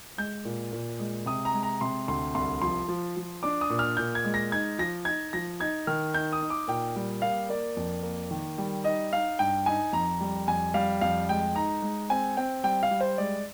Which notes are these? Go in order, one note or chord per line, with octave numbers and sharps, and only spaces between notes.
G#3 G6
A#2
A#2
G#3
C3 D#6
A#5
G#3
A#5
C3 C6
D2 C6
C2 C6
F3 C6
F3
F3
D4 D6
D#6
A#2
F6
A#2 G6
G#6
G#3
A#6
D#4 G#6
F3 A#6
D#4 G#6
F3 A#6
D#4 G#6
D#3 F6
D#4 G6
D#6
D#4
D6
A#2 G5
G3
A#3 F5
A#3 D5
F2
A#3
D#3
G3
D#4 D#5
D#4 F5
G2 G5
D#4 G#5
F2 A#5
G3
F2 G#5
G3 F5
F2 F5
G#3 G5
D#4 A#5
G#3
C4 G#5
C4 G5
G3 G5
F5
G3
C5
G#3 D5